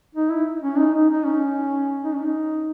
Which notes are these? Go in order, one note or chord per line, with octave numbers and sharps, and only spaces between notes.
D#4
E4
C#4
D#4
D#4
D#4
C#4
D#4
C#4
D#4